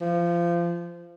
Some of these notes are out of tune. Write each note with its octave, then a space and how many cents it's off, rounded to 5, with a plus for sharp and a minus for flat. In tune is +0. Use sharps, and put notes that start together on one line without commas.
F3 -25